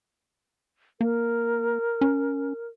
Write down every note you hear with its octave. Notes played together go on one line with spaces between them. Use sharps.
A#3 A#4
C#4